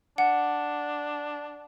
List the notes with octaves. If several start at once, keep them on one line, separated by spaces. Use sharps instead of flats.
D4 F#5